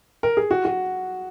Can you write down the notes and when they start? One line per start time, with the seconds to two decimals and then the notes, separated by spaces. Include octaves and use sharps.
0.23 A#4
0.37 G#4
0.51 F#4
0.65 F#4